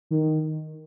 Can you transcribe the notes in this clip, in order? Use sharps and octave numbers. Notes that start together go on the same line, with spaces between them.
D#3